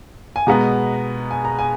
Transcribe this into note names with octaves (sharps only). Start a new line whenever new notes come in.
G#5
B2 G#3 B3 A#5
G#5
A#5
G#5